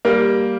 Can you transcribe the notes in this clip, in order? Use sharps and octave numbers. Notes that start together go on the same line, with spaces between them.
G3 A#3